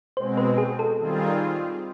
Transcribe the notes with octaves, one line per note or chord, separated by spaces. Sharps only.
B2 G#3 C4 C5
B4
G#4
A4
D#3 G3 C4 F4 G#4